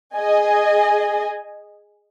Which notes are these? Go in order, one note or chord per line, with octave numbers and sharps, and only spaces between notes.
G#4 D#5 G#5